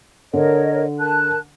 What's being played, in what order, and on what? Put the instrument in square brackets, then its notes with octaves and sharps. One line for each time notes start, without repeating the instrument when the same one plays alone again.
[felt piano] D3 [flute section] A#4 C#5 D#5
[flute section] A#4 A5 F#6